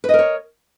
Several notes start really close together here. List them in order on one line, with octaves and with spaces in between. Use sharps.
B4 D#5 A#4 C#5